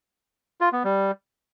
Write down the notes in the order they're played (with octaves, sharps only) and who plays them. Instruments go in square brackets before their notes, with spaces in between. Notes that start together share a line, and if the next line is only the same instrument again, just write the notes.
[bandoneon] F4
B3
G3